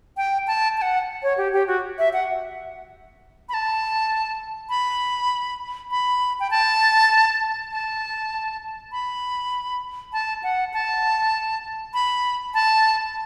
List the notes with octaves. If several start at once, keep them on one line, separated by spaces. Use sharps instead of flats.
G5
A5
A5
F#5
C#5
G4
G4
F#4
E5
F#5
B5
A5
B5
B5
G5
A5
A5
B5
A5
F#5
A5
B5
A5